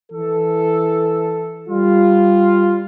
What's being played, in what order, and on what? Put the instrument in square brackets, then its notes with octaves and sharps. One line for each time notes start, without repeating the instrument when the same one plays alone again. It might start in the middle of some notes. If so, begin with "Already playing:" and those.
[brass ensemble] E3 A4
G3 F4